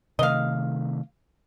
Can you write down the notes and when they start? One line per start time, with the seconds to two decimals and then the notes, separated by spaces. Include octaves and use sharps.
0.19 C3 D#3 A3 D#5 F5